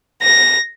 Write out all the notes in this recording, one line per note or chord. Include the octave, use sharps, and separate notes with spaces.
A#6